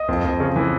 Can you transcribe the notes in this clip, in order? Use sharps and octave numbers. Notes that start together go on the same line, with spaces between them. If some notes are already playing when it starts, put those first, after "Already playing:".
Already playing: D#5
F2
F2
C#3
E3